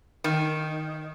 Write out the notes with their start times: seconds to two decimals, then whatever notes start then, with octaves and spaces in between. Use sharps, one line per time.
0.24 D#3